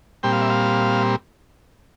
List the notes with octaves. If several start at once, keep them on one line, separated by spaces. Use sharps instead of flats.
A#2 G3 C4 G5
F5
E5
F5